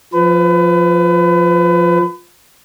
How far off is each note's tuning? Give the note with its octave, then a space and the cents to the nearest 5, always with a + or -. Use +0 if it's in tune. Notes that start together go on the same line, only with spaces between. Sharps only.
F3 +0 B4 +30